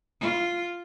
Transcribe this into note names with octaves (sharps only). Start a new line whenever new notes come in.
F4